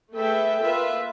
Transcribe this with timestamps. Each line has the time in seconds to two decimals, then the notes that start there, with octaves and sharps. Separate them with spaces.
0.14 A3 G#4 A4 B4 E5 G5
0.62 A#3 F4 B4 E5